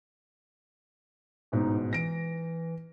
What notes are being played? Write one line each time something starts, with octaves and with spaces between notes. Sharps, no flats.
A1 G#2 B2 D#4
E3 A#6 D7